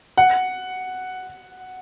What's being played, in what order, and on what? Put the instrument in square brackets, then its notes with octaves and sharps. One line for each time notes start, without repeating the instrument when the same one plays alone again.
[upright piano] F#5